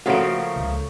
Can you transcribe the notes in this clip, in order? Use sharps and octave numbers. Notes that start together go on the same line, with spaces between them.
C#3 F3 A3 A#3 F#4 C#5 D7
C#2